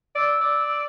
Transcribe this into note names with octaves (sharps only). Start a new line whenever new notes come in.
D5 E6
D5